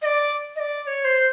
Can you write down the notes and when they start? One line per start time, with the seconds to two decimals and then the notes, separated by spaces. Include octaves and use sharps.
0.02 D#5
0.06 D5
0.56 D#5
0.59 D5
0.83 D5
0.87 C#5
1.05 C5